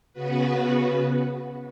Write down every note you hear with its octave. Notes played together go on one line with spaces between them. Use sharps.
C#3 B3 F#4 B4